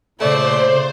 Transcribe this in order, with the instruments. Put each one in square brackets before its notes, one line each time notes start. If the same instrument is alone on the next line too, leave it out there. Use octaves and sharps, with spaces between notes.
[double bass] A#2 C#3 [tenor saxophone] A3 [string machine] C5 [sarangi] D5